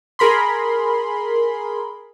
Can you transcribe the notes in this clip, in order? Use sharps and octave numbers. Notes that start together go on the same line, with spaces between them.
G#4 A#4 B5 C6